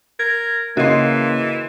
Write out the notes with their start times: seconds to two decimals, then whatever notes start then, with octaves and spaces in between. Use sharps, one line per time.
0.19 A#4 G#6
0.77 C#3 E3 A#3 F#4 D#5 C6 C7